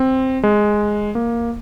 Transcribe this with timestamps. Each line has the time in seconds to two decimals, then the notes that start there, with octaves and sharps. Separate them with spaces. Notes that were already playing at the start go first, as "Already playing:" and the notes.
Already playing: C4
0.43 G#3
1.15 A#3